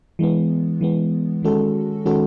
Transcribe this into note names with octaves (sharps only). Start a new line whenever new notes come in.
E3 G#3 B3
E3 G#3 B3
D#3 G#3 C#4 F#4 A4
D#3 G#3 C#4 F#4 A4